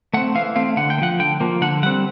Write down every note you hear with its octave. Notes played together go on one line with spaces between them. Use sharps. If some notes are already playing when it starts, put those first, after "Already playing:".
A3 C4 F#5
E3 F5
A3 C4 F5
D3 F#5
G5
A#3
F3 F#5
D3 G5
F3 A#3
D3 F#5
G3 C4 F#5